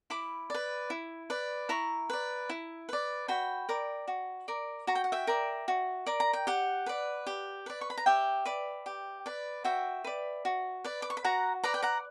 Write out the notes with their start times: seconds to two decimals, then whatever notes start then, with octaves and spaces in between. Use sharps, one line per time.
0.10 E4 B5 D6
0.50 B4 D5
0.90 E4
1.30 B4 D5
1.69 E4 A#5 C#6
2.10 B4 D5
2.50 E4
2.89 B4 D5
3.28 F#4 G5 B5
3.69 A#4 D5
4.08 F#4
4.48 A#4 D5
4.87 F#4 A#5
4.95 G5
5.04 F#5
5.12 E5 G5
5.27 A#4 D5
5.68 F#4
6.06 A#4 D5
6.20 A#5
6.33 G5
6.47 G4 F#5
6.86 B4 D5
7.27 G4
7.66 B4 D5
7.81 C#6
7.90 B5
7.97 A#5
8.06 G4 E5 G5
8.45 B4 D5
8.86 G4
9.26 B4 D5
9.64 F#4 E5 G5
10.04 B4 D5
10.45 F#4
10.84 B4 D5
11.02 D6
11.10 C#6
11.17 B5
11.24 F#4 F#5 A#5
11.64 B4 D5 A#5
11.74 G5
11.82 F#5 A#5